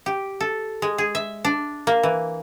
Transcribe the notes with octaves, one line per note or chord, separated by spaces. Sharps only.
G4
A4
G#3
G#4
E5
D4
A#3
E3